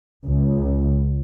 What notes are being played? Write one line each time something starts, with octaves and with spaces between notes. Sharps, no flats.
C#2